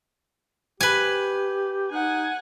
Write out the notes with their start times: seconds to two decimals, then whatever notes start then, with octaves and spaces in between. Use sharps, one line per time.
0.81 G4 B4 G#5
1.91 D#4 F#5 G#5